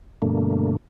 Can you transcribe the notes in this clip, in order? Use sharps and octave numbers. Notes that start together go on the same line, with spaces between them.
G2 B2 D3 A3 A#3